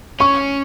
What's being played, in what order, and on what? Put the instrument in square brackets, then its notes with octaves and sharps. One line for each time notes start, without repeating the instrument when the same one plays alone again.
[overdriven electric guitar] C#4 [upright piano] C#6